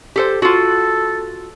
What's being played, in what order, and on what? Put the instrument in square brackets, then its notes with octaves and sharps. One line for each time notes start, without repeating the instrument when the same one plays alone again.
[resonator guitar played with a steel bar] G4 A4 C5
[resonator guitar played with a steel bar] F4 F#4 [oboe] A4